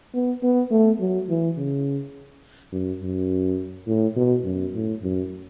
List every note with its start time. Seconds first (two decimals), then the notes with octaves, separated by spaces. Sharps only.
0.14 B3
0.43 B3
0.71 A3
1.00 F#3
1.29 E3
1.57 C#3
2.72 F#2
3.01 F#2
3.87 A2
4.16 B2
4.45 F#2
4.74 A2
5.03 F#2